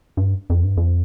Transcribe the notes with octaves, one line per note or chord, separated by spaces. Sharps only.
G2
F2
G2
F2